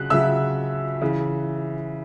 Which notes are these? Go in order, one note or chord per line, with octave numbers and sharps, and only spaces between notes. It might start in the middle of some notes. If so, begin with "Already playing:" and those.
Already playing: C#3 F#3 F#6
C#3 F#3 E5 E6
C#3 E3